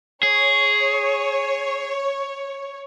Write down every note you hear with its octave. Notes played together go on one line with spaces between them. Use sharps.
G#4 C#5